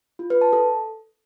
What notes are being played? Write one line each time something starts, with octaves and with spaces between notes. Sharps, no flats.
F4
B4
A5
A4